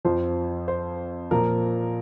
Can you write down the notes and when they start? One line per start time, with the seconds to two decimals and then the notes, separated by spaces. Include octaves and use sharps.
0.05 F2 F3 C5
0.68 C5
1.31 A#2 F3 A#4